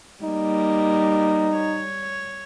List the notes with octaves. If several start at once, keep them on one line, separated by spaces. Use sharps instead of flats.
G3 A#3 D#4
C#5